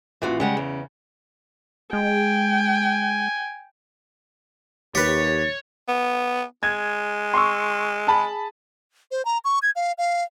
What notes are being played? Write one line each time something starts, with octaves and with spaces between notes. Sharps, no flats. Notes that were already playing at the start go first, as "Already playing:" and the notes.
A1 A#2 E3 F4 F#4
C#3 G3 G#3 F#5
E2
G#3 G5 G#5
D#2 G4 B4 C#5 A6
B3
G#3 G#6
C6 C#6 E6
G#4 A5 B5
C5
A#5
C#6
G#6
F5
F5